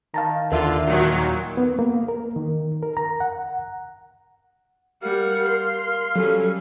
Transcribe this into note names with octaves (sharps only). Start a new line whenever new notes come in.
D#3 F5 A5 A#5
D#2 D3 F4 A#4 E5
A#2 D#3 F#3
B3
A#3
A#4
D#3
A#4
A#5
F#5
G3 A#4 F5 F#5
C6
F#3 G3 C#4 A4